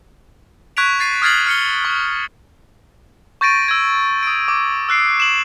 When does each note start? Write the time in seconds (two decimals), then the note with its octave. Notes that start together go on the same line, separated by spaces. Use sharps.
0.77 C#6 F#6 G#6 B6 D7 F7
1.00 A6 C7 D#7
1.22 D#6 F6 G#6 A6 C7 F#7
1.46 F6 C#7 G7
1.85 C#6
3.41 C#6 G6 A6 A#6 D7 D#7
3.68 E6 G#6
4.23 D#6 D7
4.48 D6
4.89 E6 F#6 C7 D7
5.20 E7 F#7